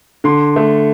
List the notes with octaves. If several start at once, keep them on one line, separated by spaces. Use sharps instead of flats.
D3 C6
A3